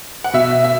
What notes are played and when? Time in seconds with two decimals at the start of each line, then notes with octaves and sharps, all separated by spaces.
0.24 F#5
0.33 B2 E5
0.64 E5